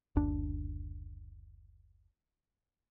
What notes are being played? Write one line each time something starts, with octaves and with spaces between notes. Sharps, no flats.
F#1 D2 D4